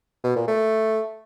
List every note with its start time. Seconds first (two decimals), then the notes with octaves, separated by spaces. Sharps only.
0.24 B2
0.36 A#2
0.48 A3